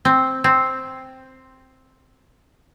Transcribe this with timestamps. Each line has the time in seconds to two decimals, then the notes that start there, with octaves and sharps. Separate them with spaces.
0.05 C4
0.44 C4